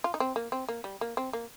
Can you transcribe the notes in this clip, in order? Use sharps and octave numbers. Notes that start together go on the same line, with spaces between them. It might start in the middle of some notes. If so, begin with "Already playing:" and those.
F4
D#4
C4
A#3
C4
A#3
G3
A#3
C4
A#3